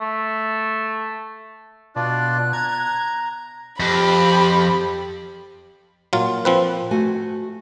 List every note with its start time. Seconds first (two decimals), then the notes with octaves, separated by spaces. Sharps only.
0.01 A3
1.96 B2 D4 F4 D5 F#6
2.53 A#5 G#6
3.80 F2 G4 C5 B5
6.13 A#2 F#3 F4
6.45 F3 C4 B4
6.91 A3 F#4 G#5